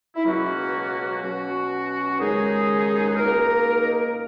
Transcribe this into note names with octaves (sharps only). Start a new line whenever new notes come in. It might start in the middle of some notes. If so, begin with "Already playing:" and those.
E4
C#2 B2 F#3 A#3 C#4 F#4
B2 F#3 C#4 F#4
D#2 C#3 G#3 D#4 G#4
B4
C#2 B2 A#3 D#4 A#4